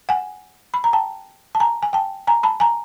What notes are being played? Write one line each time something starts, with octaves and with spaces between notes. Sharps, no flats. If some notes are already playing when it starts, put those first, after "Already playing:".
F#5 G#5
B5
A#5
G5 A5
A5
G#5 A#5
G#5
G5 A5
G#5 A#5
A5 B5
G#5 A#5